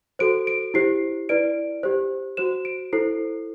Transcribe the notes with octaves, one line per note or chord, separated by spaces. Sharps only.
F#4 A4 C5 D7
D7
E4 G4 C5 C7
E4 B4 D5 D7
G4 C5
F#4 C5 E7
D7
E4 A4 C5 C7